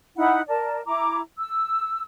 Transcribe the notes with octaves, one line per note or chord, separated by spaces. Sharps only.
D#4 E4 F#5 B5
A#4 D5 A5
E4 A#5 D6
E6